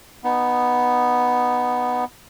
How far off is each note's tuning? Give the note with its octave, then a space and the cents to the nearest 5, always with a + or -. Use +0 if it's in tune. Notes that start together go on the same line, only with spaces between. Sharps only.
B3 +0 D#4 -20